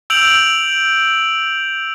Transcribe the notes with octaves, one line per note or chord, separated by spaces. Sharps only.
E6 G6 D7 F7 F#7